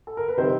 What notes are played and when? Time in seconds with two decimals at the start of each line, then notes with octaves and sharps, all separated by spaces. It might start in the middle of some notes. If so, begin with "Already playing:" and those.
0.07 A4
0.17 A#4
0.28 B4
0.37 C3 D#3 G3 C4 C5